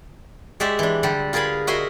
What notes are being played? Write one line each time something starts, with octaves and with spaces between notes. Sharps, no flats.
G#3 F#4 G4 D5 E5
E3 D4
D3 G3 G4 A4
F4 G#4 A#4 B4 G#5 B5
F#4 A#4 D#5 E5 G#5 C6